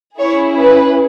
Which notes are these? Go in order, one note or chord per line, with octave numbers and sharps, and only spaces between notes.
C#4 E4 G#4 C#5
B4